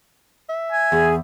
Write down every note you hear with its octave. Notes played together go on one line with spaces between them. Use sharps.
E5
G#5
E2 G#4